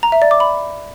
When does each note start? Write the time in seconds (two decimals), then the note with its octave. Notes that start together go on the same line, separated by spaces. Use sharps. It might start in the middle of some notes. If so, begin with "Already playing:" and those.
0.03 A#5
0.12 E5
0.22 D5
0.31 D6
0.40 B5